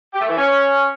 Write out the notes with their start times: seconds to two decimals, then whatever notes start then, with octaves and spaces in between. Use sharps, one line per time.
0.14 G4
0.21 A3
0.29 E3
0.36 C#4